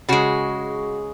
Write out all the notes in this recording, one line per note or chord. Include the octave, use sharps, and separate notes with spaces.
C#3 G#3 F#4